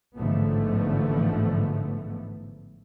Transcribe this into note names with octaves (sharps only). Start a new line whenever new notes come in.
A1 G#2 D3 F3 A3 B3